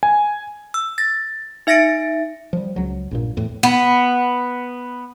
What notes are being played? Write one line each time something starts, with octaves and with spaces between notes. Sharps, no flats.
G#5
E6
A6 A#6
D#4 E5 A6 A#6 C#7 D7
F3 G3
C#2 F#3
A#1 G2 A#2
E2 A2
B3